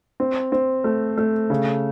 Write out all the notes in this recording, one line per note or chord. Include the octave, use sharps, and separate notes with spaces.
C4
C4
A3
A3
C#3